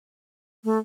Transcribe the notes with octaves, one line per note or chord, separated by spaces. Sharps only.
A3